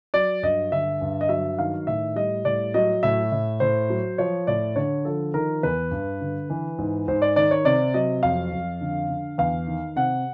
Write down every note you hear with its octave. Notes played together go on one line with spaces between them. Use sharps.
F#3 D5
G2 D#5
D3 E5
G2
D#5
F#3 E5
D#3 F5
A2 E5
G3 D#5
A2 D5
F#3 D#5
A2 E5
A2
A2 C5
F#3
F3 C#5
A2 D5
D3 C#5
F3 A4
D#3 A#4
E2 B4
G2
D3
E3
G#2
G#2 C5
D5
D#3 D5
C#5
C3 D5
F#3 D#5
F2 F5
F2
D3
D3
E2 F5
D#3
C3 F#5